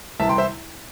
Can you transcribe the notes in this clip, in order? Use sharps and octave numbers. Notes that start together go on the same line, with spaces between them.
C2 C3 E3 E5 A5
G5 C6
C5 E5